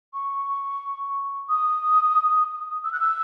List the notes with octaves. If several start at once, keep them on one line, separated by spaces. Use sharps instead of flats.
C#6
D#6
E6
F#6
E6